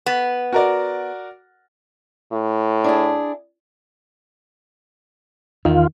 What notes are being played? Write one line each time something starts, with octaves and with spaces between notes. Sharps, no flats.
B3
F#4 A#4 D5
A2
D4 E4 G#4
E2 D#3 F4